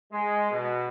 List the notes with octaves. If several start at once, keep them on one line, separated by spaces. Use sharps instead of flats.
G#3
B2